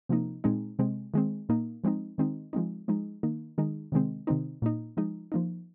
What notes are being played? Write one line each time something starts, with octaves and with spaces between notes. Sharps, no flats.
C3 F3 A#3 D#4
A#2 G#3 C4 D#4
C3 G#3 C4
D#3 G#3 C4
A#2 A#3 D#4
F3 G#3 C4 D#4
D#3 G#3 C4 D#4
F3 G#3 C4 D#4
F3 G#3 D#4
D#3 A#3 D#4
D#3 G#3 D#4
C3 D#3 G#3 C4
C3 D#3 C4 D#4
A#2 A#3 D#4
F3 G#3 D#4
F3 A#3 D#4